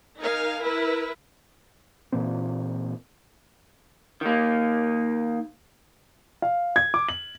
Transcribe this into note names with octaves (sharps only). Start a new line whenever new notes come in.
D#4 A#4 F5 G#5
E4 A#4 B4
A#2 E3 A#3 C4
D#3 A#3
F5
G#6
D6
F#7